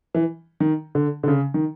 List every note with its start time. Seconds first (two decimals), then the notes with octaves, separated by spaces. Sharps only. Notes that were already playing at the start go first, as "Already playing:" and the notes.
0.15 E3
0.60 D#3
0.95 D3
1.23 D3
1.28 C#3
1.54 D#3